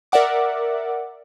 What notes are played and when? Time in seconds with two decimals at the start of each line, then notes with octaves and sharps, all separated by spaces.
0.12 A#4 D5 E5 F#5 D6